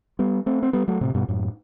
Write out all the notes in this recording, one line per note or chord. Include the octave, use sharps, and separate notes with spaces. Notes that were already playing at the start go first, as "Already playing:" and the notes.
G3 B3
A3 C4
C4
G3 B3
F#3 A3
A2 C3
G2 B2
F#2 A2